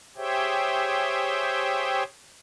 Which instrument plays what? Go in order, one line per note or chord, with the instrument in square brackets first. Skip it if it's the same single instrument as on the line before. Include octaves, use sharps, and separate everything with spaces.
[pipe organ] G4 G#4 C5 C#5 E5 G5